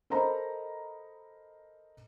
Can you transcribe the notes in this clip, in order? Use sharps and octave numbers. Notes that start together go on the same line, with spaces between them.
A4 A#4 C5 D#5 A#5 B5